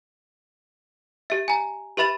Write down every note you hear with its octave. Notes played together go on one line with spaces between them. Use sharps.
G4 E5
G#5 A#5
G4 B4 E5 B5 A6 E7